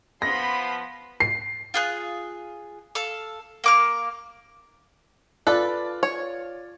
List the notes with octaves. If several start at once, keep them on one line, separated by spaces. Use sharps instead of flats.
F3 B3 B5 C6 A#6
C7
F4 G#4 F#6
A4 F5
A#3 D6 F6
F4 A4 B4 D5
C#5